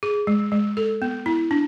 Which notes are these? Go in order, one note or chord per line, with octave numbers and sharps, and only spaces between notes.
G#4
G#3
G#3
A4
B3
E4
D4